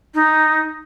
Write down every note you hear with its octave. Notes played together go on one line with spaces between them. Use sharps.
D#4